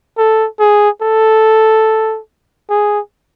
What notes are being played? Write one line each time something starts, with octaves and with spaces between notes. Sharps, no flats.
A4
G#4
A4
G#4